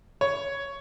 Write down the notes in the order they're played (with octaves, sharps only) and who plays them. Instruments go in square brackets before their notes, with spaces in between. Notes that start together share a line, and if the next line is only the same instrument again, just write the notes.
[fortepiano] C#5